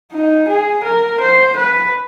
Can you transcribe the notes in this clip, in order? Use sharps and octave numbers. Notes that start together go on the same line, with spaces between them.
D#4
G#4
A#4
C5
B4